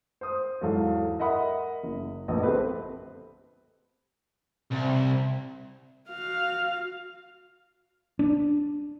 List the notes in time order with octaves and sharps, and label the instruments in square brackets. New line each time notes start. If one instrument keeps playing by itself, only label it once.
[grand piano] C5 D#6
E2 G#2 F#3 A4 F5
A#4 D#5 E5 F#5 B5 D#6
F#1
D1 A#1 B3 D#5
C4 G4 A4 B4
[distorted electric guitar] C2
[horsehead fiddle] F#4 F5
[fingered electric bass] D4